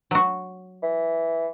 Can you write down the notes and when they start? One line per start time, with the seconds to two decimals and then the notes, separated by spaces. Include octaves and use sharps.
0.11 F#3 F#4
0.83 E3